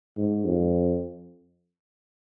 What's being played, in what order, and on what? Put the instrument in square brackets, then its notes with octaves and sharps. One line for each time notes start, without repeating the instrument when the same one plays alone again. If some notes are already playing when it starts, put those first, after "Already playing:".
[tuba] G#2
F2